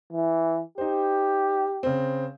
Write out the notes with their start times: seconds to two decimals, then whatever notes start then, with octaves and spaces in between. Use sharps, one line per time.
0.13 E3
0.78 D#4 G4 C5
1.83 C#3 C4